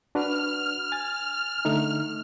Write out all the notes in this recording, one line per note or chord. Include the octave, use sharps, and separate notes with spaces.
D4 F#4 B4 F6
G#5 A6
D3 A3 D#4